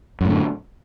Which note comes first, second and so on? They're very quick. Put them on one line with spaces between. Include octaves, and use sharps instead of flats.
F#2 A2 D3